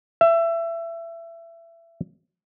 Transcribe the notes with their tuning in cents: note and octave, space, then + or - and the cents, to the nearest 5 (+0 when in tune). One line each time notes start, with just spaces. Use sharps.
E5 +25